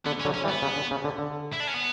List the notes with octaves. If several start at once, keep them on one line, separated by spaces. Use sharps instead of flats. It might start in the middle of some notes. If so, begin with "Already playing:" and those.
D3 B3
C#4
D3 F#3
C#4
E3 G3
B3
C#3
D3
C#3
D3
D3
E4
D4
C#4
B3